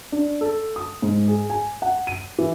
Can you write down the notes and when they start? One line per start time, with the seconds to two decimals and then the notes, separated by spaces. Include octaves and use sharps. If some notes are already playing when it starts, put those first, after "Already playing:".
0.12 D4
0.41 A4
0.76 D#6
1.02 G#2
1.28 G#4
1.50 G#5
1.82 F#5
2.07 D#7
2.39 E3